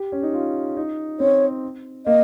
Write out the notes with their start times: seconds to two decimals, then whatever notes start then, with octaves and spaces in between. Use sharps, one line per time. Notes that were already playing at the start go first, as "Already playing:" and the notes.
Already playing: G4
0.12 C#4
0.23 D#4
0.33 F4
0.77 D#4
1.20 C4 C#5
2.06 A#3 D#5